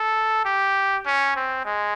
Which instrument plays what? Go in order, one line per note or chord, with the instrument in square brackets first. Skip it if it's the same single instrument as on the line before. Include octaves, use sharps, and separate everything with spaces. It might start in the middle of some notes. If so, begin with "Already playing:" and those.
Already playing: [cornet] A4
G4
C#4
C4
G#3